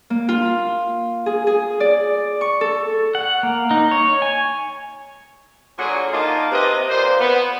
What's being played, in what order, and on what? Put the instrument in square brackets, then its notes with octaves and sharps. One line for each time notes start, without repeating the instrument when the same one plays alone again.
[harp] A#3
F4
G#4
G#4
D5
C#6
A4
[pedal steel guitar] F#5
A#3
D#4
C#5
G#5
[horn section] A#2 D3 F#3 F#4 G#4
A#3 D#4 F4 D#5 A5
C3 B4 D#5
A#2 C5
B3